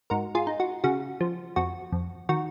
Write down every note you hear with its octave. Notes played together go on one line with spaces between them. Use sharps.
G#2 F#4 A#4
F4 G#4
D#4
F#4
C#3 F#4
F3
F2 F#4
F2
D#3 F#4